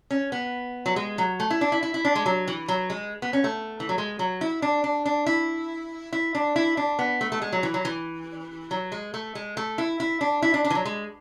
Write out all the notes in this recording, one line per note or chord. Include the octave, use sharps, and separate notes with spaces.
C#4
B3
F#3
G#3
F#3
A3
E4
D4
E4
E4
E4
D4
G#3
F#3
E3
F#3
G#3
B3
C#4
A3
E3
F#3
G#3
F#3
E4
D4
D4
D4
E4
E4
D4
E4
D4
B3
A3
A3
G#3
F#3
E3
F#3
E3
F#3
G#3
A3
G#3
A3
E4
E4
D4
E4
D4
D4
E3
F#3
G#3